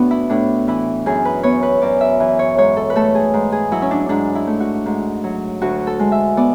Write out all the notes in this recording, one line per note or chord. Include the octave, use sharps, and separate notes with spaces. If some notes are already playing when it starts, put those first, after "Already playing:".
Already playing: A2 B3 D4 F#4
E4
A2 D4
E3 E4
F#2 G#4
B4
B3 C#5
B4
F#2 D5
E5
E3
C#5
G#2 C#5
A4
B4
A3 A4
G#4
G#2
G#4
F#3 E4
C#4
D4
G#2 D4
E4
A3
F#4
G#2
F#3
D2 F#4
A4
G#3
E5
B3 D5